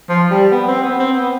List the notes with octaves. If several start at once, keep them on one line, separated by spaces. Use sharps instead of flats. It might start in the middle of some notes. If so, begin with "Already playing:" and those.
F3
G3
B3
C4
B3
C4
B3